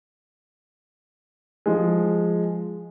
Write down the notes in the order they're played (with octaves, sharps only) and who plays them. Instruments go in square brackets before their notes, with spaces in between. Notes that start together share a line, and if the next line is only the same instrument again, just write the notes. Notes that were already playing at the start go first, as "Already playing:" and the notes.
[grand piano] F3 G#3